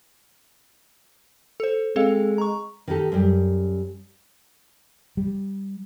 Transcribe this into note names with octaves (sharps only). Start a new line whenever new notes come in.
A4 C5
G#3 C4 A4 F5
A#5 C#6
D#3 D#4 G4 A4
F#2 G3
G3